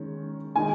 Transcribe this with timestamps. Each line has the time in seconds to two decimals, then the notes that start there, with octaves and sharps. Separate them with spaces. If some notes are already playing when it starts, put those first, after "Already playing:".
Already playing: D#3 G#3 C#4
0.56 D#3 G#3 D#4 G#5